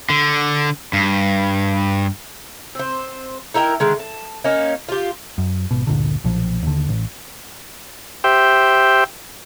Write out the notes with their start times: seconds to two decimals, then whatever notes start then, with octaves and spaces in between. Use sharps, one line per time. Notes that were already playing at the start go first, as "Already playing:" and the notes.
0.10 D3
0.93 G2
2.75 C4 C5
3.54 D#4 E4 A#4 G5
3.80 D3 D#3 G#3
3.99 A5
4.44 A#3 C#4 D#4
4.89 F4 G4
5.38 F#2
5.71 G#1 B2
5.87 G1 D2 A#2 D3
6.24 B1 A#2 F3
6.63 D#2 D3
6.89 A1
8.24 G4 C5 E5 G5